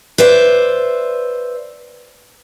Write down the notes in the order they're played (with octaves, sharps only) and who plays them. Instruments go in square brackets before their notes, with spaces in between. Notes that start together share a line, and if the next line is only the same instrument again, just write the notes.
[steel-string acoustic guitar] B4 C5 D5 E5